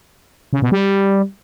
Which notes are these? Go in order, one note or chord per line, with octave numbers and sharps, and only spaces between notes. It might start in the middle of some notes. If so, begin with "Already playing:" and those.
C#3
B2
G3